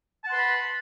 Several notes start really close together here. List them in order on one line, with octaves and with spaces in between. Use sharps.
A5 F#5 C6 B4 B5